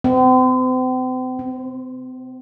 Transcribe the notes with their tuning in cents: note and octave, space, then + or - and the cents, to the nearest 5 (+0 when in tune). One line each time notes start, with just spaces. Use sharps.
C4 -40
C4 +10